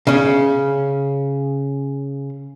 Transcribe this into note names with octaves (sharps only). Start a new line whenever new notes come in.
C#3 C#4